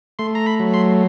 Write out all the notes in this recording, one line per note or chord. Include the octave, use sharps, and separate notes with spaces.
A3 C6
A#5
B5
F#3
C6